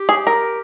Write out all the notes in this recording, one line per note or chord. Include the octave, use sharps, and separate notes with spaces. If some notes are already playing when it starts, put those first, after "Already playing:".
Already playing: G4
G#4
A#4